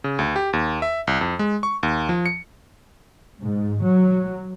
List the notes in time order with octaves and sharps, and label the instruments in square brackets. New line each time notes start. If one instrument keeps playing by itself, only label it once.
[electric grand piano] C#3
D2
G4
D#2
E5
C2
F2
G#3
C#6
D#2
F3
C#7
[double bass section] G#2
F#3